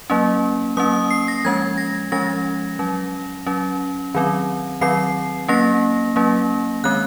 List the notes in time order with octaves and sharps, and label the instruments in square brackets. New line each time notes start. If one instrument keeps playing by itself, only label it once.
[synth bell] F#3 A#3 C#4
F#3 A#3 C#4 D#6
D#6
C7
A#6
F3 G#3 C#4 G#6
A#6
F3 G#3 C#4 A#6
F#3 C#4
F#3 C#4
D#3 F#3 C4
D#3 F#3 C4 C7
F#3 A#3 C#4 A#6
F#3 A#3 C#4
D#3 G#3 C4 F#6